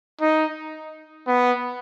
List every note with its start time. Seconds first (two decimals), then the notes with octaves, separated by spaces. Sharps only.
0.21 D#4
1.27 B3